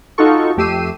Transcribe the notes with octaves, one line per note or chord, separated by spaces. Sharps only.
D#4 F4 F#4 A4 C#6
F2 A3 G4 E6 C7 D#7